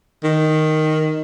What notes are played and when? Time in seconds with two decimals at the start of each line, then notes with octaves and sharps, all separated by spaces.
0.24 D#3